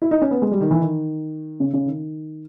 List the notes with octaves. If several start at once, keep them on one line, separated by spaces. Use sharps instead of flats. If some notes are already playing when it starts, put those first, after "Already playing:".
E4
D#4
C#4
B3
G#3
G3
D#3
E3
D#3
C#3
C#3
D#3